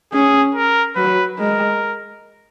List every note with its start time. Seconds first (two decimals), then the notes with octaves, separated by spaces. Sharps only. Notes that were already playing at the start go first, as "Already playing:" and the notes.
0.13 C#4 G#4
0.55 A#4
0.96 F#3 B4
1.38 G#3 A#4